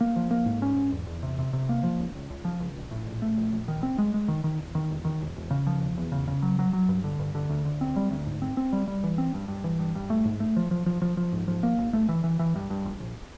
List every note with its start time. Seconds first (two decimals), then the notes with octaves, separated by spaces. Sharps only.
0.01 A#3
0.16 F3
0.31 A#3
0.46 G#2
0.62 C#4
0.76 G#2
0.92 E2
1.07 E2
1.23 C3
1.39 C3
1.53 C3
1.69 A#3
1.83 F3
1.99 C#2
2.15 C#2
2.30 C#2
2.45 F3
2.60 C#2
2.76 A#1
2.91 A2
3.06 A#1
3.22 A3
3.37 A#1
3.53 A#1
3.68 D#3
3.83 C4
3.98 G#3
4.14 G#3
4.28 D#3
4.44 D#3
4.59 E1
4.75 D#3
4.91 E1
5.05 D#3
5.21 E1
5.36 E1
5.51 C#3
5.67 F3
5.81 E1
5.97 E2
6.12 C#3
6.28 C#3
6.42 F#3
6.59 F#3
6.73 F#3
6.89 G2
7.04 D3
7.19 G2
7.35 D3
7.50 D2
7.65 D2
7.81 C4
7.96 G3
8.11 D2
8.26 G#2
8.42 C4
8.57 C4
8.73 G3
8.88 G3
9.04 E3
9.18 C4
9.34 G2
9.48 G2
9.64 E3
9.79 G2
9.95 G2
10.10 A3
10.25 G#2
10.40 A3
10.56 F3
10.71 F3
10.86 F3
11.02 F3
11.17 F3
11.33 G#2
11.48 F3
11.63 A#3
11.78 G#1
11.93 A3
12.09 E3
12.24 E3
12.39 E3
12.56 G2
12.70 G2
12.85 A#1
13.00 A#1